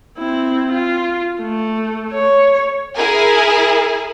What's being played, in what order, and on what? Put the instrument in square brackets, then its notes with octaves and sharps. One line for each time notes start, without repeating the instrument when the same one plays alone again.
[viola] C4 E4
F4
A3
C#5
[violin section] E4 G#4 A#4 G#5